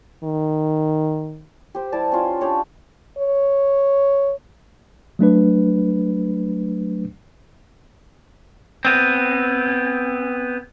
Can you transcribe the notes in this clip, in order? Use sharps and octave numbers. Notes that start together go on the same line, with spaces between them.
D#3
G4 C5
G3 E4 D5 A5
C#4 F4
D4 G4 C#5
C#5
F#3 A3 D4 B4
B3 C4